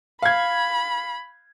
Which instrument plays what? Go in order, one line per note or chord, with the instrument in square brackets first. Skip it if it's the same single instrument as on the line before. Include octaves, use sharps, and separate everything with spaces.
[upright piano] F5 G#6 [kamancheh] B5